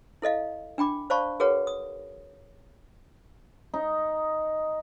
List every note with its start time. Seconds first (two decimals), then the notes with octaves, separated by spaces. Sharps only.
0.22 E4 A4 D#5 F5
0.78 D4 G5 B5 D6
1.10 C5 D5 F5 A5 B5 C#6
1.40 F#4 G#4 A#4 B4 C#5 F#5
1.67 D#6
3.74 D#4